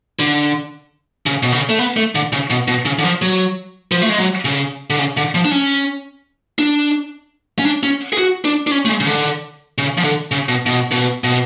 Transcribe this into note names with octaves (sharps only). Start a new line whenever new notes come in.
D3
C#3
B2
C#3
A3
B3
A3
D3
C#3
B2
B2
C#3
D3
F3
F#3
F3
A3
G#3
F#3
C#3
D3
C#3
D3
F3
D4
C#4
D4
C#4
D4
C#4
G#4
F#4
D4
D4
C#4
A3
G#3
C#3
D3
C#3
F3
D3
C#3
B2
B2
B2
B2